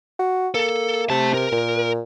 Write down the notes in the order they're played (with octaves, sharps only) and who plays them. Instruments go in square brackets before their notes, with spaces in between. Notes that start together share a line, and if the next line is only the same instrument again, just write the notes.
[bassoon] F#4
[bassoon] A#3 [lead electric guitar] A4
[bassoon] C3 [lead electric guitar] A3 A5
[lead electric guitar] A#4
[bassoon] A#2